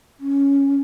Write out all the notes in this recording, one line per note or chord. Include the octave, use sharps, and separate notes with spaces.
C#4